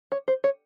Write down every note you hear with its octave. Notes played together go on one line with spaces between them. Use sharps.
C#5
C5
C#5